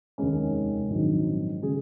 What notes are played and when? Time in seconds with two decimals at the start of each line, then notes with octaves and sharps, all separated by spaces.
0.18 F1 D#2 D#3 G#3 C#4
0.90 A#1 G#2 D#3 F#3 C4
1.62 C#3 G#3 C#4 G#4